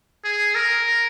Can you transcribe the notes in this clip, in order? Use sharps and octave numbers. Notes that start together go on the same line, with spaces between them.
G#4
A#4